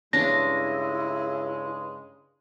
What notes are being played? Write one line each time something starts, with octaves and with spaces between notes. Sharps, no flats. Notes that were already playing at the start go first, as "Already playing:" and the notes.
G2 C#3 G#3 C#4 D4 E4 A#6